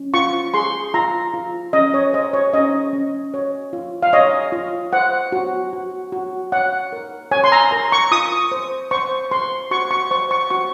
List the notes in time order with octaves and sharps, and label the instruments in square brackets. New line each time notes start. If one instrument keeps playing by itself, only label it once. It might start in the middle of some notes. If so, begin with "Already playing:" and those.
Already playing: [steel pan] C#4
F4 C#6
G#4 C6
F4 A#5
F4
C#4 D#5
C#5
C5 D#5
C#5
C#4 D#5
C#4
C#5
F4
F5
C#5 D#5
F4
C5 F#5
F#4
F#4
F#4
C#5 F#5
A#4
C#5 G#5
C6
A#5
A#4 A#5
C#6
F4 D#6
C5
C5 C#6
C5 C6
F#4 C#6
C#6
C5 C#6
C#6
F#4 C#6